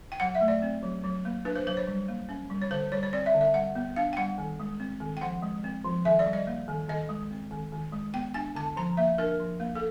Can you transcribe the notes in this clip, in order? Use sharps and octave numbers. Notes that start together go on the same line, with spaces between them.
G5
F#3 F#5
E5
A3
D5
C4
F#3
F#3
A#3
D4 B4
C5
F#3 C5
C#5
G3
A#3
C#4
G3
C#5
D3 C5
G3 C#5
C#5
C4 D5
E5
D3
E5
G3 F#5
B3
D4 F5
G5
G3 F#5
D#3
G#3
C4
D#3
G5
F3 F#5
G#3
C4
F3
D#3 E5
D5
G3
D#5
A#3
D#3
D#3 D#5
G#3
C4
D#3
D#3
G#3
B3 G5
D4 G#5
D3 A5
F3 A#5
A#3 E5
D4 A#4
F3
A#3
A4